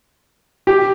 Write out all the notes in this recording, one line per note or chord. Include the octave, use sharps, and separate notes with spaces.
G4